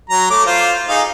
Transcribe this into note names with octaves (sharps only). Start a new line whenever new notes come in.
F#3 A#5
A3 D6
F4 C5
D#4 G#4 F5